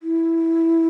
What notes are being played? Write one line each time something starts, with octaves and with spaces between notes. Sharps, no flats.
E4